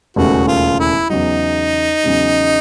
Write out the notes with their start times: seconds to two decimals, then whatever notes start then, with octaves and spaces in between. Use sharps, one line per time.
0.16 E1 D#2 C#3 E3 A3 F#4
0.48 F4
0.79 E4
1.09 E2 C#3 F#3 D#4
2.03 E2 C#3 F#3